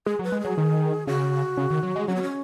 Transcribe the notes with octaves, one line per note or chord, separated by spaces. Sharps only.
G#3 G#4
F#3
B4
G#3
F#3 G#4
D#3
C#3 F#4
C#3
D#3
F#3
G#3
F#3 C#4
B3
C#4